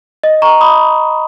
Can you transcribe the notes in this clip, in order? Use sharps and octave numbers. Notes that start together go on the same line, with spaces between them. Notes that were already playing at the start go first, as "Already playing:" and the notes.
D#5
A#5 C#6
B5 D#6